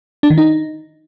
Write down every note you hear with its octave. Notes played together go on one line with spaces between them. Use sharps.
D4
D#3
D#4